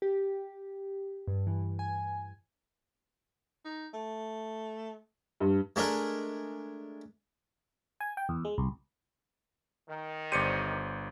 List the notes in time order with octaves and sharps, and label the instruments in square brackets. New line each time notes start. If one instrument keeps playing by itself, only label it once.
[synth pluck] G4
G2
E3
G#5
[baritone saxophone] D#4
A3
[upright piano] G2
[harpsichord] G#3 A3 D4 A#4
[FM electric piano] G#5
G5
E2
G#3
C2
[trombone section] D#3
[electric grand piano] G1 C#7 D#7 [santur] G4 C5 D5